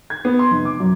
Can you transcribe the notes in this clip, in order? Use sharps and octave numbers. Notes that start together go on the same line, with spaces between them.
G#6
B3
C6
F1
D6
F#2